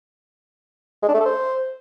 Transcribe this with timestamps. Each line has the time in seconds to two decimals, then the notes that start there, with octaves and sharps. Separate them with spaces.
1.03 G#3
1.09 D4
1.14 A3
1.20 A4
1.26 C5